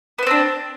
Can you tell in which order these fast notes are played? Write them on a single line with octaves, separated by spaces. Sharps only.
B3 C5 C4 D4